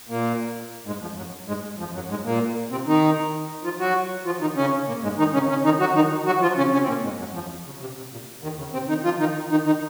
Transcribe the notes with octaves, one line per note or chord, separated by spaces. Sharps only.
A#2 A#3
G#2 G#3
F2 F3
F#2 F#3
G#2 G#3
F2 F3
F#2 F#3
G#2 G#3
A#2 A#3
C3 C4
D#3 D#4
F3 F4
F#3 F#4
F3 F4
D#3 D#4
C#3 C#4
A#2 A#3
G#2 G#3
D#3 D#4
C#3 C#4
C#3 C#4
D#3 D#4
F#3 F#4
D#3 D#4
F#3 F#4
F3 F4
C#3 C#4
C#3 C#4
C4
A#2 A#3
G#2 G#3
F#2 F#3
F2 F3
C#3
C3
C3
A#2
D#2 D#3
C#3
C3 C4
D#3 D#4
F3 F4
D#3 D#4
D#3 D#4
D#3 D#4